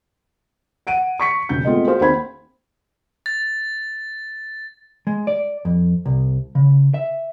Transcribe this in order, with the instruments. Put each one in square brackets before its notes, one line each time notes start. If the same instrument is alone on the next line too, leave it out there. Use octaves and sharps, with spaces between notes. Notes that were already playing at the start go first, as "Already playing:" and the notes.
[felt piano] F#5 D7 D#7
C#6 B6 C#7
E1 C#3 G6
G#3 A3 B3 C4 F4 G#4
F#4 G#4 C5 F5
D#2 C4 C5 B5 G#6
[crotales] A6
[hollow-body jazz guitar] G#3
D5
F2
C2
C#3
E5